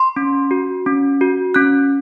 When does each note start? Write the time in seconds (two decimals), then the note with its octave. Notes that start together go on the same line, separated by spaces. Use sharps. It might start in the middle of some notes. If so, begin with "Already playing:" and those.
Already playing: C6
0.16 C#4
0.51 F#4
0.86 C#4
1.21 F#4
1.54 C#4 F#6